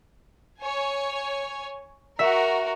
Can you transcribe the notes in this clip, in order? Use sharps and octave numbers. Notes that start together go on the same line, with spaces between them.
C#5 G#5
F#4 A#4 E5